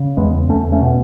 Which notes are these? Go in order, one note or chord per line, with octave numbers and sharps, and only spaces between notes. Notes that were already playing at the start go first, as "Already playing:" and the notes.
Already playing: C#3
E2 G#3 B3
E2 A3 C#4
A3 C#4
B2